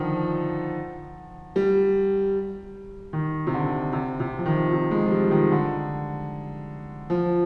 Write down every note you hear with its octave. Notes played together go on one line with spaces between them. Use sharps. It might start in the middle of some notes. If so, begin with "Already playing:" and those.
Already playing: D3 D#3 F3
G3
D#3
C3
D3
C3
C3
F3
D#3
C3
G#3
F3
G3
D#3
D3
F3